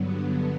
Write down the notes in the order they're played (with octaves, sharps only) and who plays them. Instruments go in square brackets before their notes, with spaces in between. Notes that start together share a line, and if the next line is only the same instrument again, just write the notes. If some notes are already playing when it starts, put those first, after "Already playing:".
Already playing: [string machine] G2 D3 F#3 B3